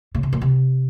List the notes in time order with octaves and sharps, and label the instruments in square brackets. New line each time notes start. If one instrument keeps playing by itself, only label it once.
[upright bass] C#3
C3
A#2
C3